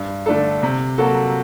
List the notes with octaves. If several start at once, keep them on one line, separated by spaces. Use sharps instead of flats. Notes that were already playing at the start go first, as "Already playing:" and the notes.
Already playing: G2
D3 A3 D4 A4
C3
F#3 A#3 F#4 A4